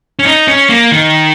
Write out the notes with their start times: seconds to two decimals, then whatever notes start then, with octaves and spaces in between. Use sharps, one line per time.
0.19 C#4
0.25 D#4
0.48 C#4
0.70 A#3
0.92 D#3